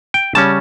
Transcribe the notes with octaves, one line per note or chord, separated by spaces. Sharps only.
G5
C#3 G3 C#4 A5